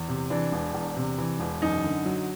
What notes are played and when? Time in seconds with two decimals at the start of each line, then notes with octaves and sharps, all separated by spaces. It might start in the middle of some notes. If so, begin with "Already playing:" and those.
Already playing: E2
0.08 C3
0.30 E3 D4
0.52 E1
0.74 E2
0.97 C3
1.18 E3
1.40 E1
1.62 F#2 D#4
1.84 D3
2.06 F#3